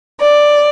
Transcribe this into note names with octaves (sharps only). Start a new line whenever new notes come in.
D5